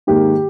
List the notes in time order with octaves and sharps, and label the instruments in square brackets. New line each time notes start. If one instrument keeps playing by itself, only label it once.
[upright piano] G#2 D#3 A#3 G4